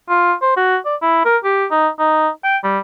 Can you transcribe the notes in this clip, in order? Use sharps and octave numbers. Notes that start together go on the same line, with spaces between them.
F4
C5
F#4
D5
E4
A#4
G4
D#4
D#4
G5
G3